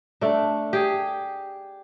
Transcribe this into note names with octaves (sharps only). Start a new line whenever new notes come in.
A3 D4
G4 G#4